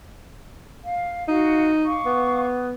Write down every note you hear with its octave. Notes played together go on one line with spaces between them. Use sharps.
F5
D#4 F#4 F5
F5 C#6 D6
B3